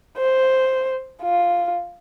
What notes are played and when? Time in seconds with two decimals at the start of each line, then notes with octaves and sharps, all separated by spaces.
0.18 C5
1.23 F4